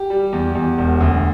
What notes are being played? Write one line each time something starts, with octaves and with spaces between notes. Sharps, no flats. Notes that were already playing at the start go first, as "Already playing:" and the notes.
Already playing: G4
G3
E2
E2
E1
D2